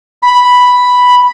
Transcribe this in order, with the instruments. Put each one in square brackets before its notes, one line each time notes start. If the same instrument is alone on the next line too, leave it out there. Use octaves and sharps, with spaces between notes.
[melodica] B5